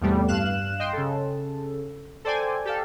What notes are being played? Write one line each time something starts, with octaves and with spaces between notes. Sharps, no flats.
E2 A2 C3 G3 A3 B3
G2 F5 F#6 E7
D#5 G5 C6
C#3 A4
A4 C5 D5 G5 G#5
G4 A4 F5